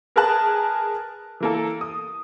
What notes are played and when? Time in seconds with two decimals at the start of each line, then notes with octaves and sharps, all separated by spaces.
0.16 G#4 A#4 B4 G#5 A5 F#6
1.40 E3 A#3 A4
1.81 D#6